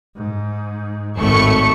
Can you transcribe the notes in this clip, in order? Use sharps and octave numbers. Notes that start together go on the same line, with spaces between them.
G#2
G#1 A2 A3 C#6 C#7